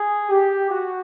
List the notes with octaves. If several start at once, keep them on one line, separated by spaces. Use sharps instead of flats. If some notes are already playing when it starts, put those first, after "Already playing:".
Already playing: G#4
G4
F#4